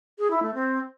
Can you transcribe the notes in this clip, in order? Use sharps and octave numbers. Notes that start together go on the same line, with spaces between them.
G#4
E4
A3
C4